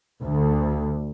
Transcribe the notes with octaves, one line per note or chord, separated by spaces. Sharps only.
D2